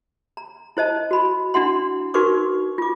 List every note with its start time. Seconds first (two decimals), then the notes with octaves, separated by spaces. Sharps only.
0.37 A#5
0.77 E4 C5 D#5 A5
1.11 F#4 B5
1.54 D4 E4 F#4 F#5 C6
2.14 D#4 F#4 A#4 B4 C#6 D6
2.78 F4 D6